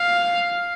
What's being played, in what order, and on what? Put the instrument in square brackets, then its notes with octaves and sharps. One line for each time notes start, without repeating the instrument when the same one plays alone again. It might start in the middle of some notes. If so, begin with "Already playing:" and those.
Already playing: [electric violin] F5